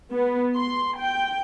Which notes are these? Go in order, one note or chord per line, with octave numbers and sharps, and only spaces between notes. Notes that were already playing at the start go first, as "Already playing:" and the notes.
B3
C6
G5